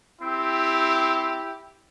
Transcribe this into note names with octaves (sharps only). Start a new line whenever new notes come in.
C4 E4 G4